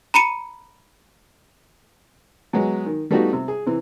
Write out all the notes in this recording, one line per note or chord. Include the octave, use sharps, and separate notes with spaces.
A#5 B5 C#7 D#7
F#3 G#3 B3
D#3
G3 A3 B3 D#4 F4 F#4
C3
G#4
C3 E3